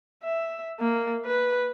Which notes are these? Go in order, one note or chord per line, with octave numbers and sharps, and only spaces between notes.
E5
A#3
B4